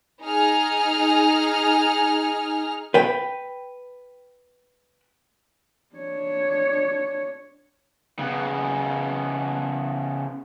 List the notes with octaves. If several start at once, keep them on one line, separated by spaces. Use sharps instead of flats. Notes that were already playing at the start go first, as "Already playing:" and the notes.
D#4 G#4 F6
B4 G5
D4 C#5
C#3 B3